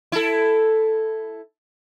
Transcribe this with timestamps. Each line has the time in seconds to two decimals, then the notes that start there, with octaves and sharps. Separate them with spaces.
0.12 E4 A4